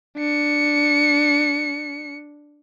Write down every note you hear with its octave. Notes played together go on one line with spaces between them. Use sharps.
D4 C#7